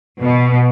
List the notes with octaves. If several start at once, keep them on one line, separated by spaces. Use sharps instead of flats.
B2